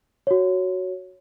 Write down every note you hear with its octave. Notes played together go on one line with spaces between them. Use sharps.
F#4 C#5